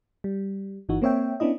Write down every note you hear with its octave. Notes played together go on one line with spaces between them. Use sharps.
G3
G1 E3 D#4 F#4
A#3 C4 C#5 E5 G5
B3 C#4 D4 E4 D#5